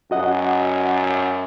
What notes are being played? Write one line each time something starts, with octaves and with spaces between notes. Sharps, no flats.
F#2 F#4 D#5 F#5